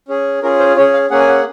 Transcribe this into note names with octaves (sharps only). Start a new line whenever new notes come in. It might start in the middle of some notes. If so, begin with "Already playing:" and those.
C#4 G#4
C#4 F4 G#4 A#4
C5
C#4 G#4 C#5
F5
A#3 C#4 G#4 F#5
G#5
F#5